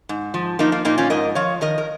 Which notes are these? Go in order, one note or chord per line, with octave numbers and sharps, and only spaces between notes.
G#2
F3
F3 A#3 D#4
A#3
A#2 A#3 D#4
C#4 F4
G#2 A#4 D#5
F3 C#5 F5
D#3 A#4 D#5
A#4